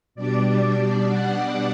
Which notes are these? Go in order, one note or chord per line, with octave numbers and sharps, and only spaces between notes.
B2 G3 D4 D5
F#5